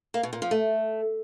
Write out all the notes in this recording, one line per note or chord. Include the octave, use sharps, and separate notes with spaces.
A#3
B2
A#2
F3
A3